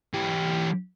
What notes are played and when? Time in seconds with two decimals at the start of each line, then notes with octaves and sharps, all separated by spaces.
0.14 E3 G4